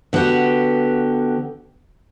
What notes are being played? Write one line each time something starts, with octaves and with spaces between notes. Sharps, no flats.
D3 B3 F#4 G4